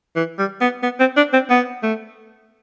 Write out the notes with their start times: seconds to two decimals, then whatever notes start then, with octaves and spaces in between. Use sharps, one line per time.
0.16 E3
0.39 G3
0.61 B3
0.83 B3
1.00 C4
1.17 D4
1.33 C4
1.50 B3
1.83 A3